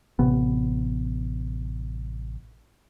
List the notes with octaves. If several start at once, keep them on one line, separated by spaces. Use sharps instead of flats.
A1 C3 B3